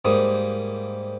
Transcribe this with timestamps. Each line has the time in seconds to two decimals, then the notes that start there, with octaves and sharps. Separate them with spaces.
0.05 G#2 G3 A#3 D#6